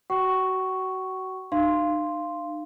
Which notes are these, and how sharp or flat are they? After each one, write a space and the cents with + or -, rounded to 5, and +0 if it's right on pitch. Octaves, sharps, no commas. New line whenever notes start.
F#4 +20 F#5 +40 C#6 +0
D#4 -45 F5 -10 C6 +0